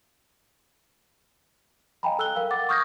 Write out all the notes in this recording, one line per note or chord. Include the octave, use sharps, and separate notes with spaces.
D#5 F5 G5 G#5 A#5 B5
A4 E6 F#6 G7
A#4 F5 G5
F#5 D6 A6
C#6 D#6 F6 G6 G#6 A#6